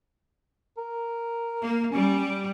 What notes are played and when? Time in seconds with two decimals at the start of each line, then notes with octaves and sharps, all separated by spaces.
0.78 A#4
1.62 A#3
1.92 G3 C#4